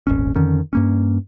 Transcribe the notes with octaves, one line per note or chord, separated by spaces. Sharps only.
D#1 G#1 C#4
F2 D3 D#3 C#4
G2 A#3 C#4